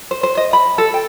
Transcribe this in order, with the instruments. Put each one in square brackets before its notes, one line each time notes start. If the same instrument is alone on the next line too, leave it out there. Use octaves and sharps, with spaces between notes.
[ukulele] C5
C5
D#5
B5
A4
G5